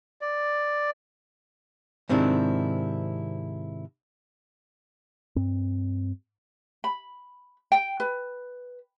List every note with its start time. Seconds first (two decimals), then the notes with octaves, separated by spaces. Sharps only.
0.21 D5
2.09 G#2 C3 D#3 C4 D4 E4
5.36 G2 C4
6.84 B5
7.72 G5
8.00 B4